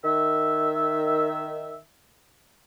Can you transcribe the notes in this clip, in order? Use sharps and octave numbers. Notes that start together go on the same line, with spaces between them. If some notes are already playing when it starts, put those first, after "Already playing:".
D#3 E5